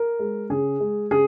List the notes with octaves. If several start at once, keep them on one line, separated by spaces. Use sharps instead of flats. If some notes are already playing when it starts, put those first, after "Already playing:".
Already playing: A#4
G#3
C#3 G#4
G#3
C#3 G#4